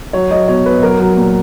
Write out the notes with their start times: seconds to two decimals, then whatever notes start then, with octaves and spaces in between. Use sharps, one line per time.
0.13 F#3 C#5
0.31 F#3 D#5
0.48 B2 C#5
0.65 B2 B4
0.82 F#3 A#4
1.00 F#3
1.17 A#2